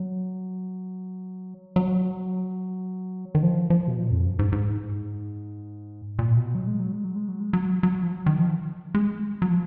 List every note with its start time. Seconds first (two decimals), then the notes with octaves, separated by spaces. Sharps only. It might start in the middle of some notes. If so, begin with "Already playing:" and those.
Already playing: F#3
1.76 F#3
3.35 D#3
3.43 F3
3.70 F3
3.88 B2
3.97 A#2
4.11 F2
4.25 F#2
4.39 G#2
4.52 G#2
6.19 A#2
6.37 B2
6.55 F#3
6.67 G#3
6.80 F#3
6.92 G#3
7.04 F#3
7.16 G#3
7.29 F#3
7.40 G#3
7.53 F#3
7.83 F#3
8.03 F3
8.12 F#3
8.26 D#3
8.38 F3
8.95 G#3
9.42 F#3
9.50 F3